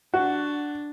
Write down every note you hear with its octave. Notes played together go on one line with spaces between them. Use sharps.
D4 F#4